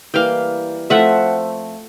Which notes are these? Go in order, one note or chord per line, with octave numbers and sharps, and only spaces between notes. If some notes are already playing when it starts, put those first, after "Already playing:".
E3 G3 A#3 F5 G5
F3 A3 C4 E5 F#5